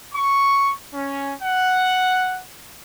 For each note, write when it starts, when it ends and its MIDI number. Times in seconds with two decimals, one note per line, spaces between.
0.13 0.72 85
0.94 1.32 61
1.42 2.41 78